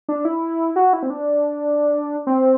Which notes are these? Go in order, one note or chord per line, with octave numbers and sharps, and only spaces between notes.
D4
E4
F#4
E4
C4
D4
C4